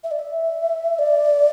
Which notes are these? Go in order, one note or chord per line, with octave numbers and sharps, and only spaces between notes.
E5
D5
E5
D5